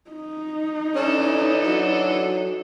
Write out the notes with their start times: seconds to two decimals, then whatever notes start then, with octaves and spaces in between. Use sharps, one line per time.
0.10 D#4
0.95 E3 C#4 D4 A4
1.66 F#3